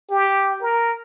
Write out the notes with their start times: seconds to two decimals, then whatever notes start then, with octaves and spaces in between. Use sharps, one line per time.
0.11 G4
0.62 A#4